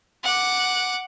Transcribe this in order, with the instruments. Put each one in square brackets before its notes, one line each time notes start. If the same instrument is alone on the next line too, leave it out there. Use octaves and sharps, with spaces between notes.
[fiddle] F#5 D6